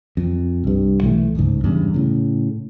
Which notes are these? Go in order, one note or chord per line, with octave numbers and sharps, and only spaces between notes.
F2
C2 G2
B1 E3 F#3 A3
D1 G1 C#2 G#2
E2 G2 C#3
A2 C#3